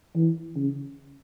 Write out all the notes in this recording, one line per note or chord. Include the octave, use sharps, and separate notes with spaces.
E3
C#3